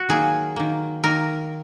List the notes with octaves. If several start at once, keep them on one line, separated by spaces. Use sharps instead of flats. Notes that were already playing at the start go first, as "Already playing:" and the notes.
Already playing: F#4
D#3 F#3 A#3 G#4
D#3 A#3
D#3 A#3 A#4